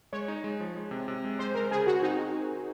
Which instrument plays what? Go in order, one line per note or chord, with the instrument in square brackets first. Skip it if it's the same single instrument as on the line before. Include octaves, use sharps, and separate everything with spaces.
[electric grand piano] G#3 [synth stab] C#5
[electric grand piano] D#4
G#3
F3
G#3
C3
C3
G#3
[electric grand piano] G#3 [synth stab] C5
[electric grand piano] G#3 [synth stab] A#4
[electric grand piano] C#3 [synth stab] G#4
[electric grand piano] C#3 [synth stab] F#4
[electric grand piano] C4 [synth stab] D#4